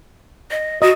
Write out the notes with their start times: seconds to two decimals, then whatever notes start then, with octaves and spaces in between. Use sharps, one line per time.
0.51 D#5
0.82 F#4 D#5